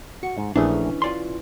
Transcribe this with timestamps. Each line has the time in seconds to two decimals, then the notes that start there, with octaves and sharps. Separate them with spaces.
0.23 F#4 C#6
0.38 G#2
0.56 A#1 E3 A3 C#4 D4 G#4
1.02 F4 D5 G#5 C6